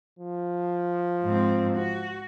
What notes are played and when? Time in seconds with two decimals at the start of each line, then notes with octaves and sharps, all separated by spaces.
0.19 F3
1.24 G#2 C4
1.77 F#4